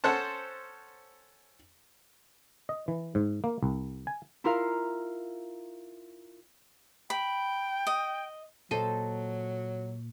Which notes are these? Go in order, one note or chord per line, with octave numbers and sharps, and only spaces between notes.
C#4 A4 C5 F#5 A5
D#5
E3
G#2
A#3
C2
G#5
E4 F4 A#4 F5
G5 B5
D#5
A#2 F#3 A#3 A4 C5 D#5